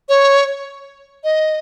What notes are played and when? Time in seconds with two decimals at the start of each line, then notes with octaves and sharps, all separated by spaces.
0.09 C#5
1.24 D#5